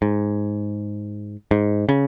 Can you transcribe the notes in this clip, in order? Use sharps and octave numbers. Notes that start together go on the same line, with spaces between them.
G#2
G#2
C#3